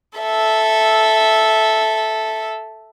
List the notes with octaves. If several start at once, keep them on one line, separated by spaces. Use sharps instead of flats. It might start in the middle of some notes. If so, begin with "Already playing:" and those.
A4 E5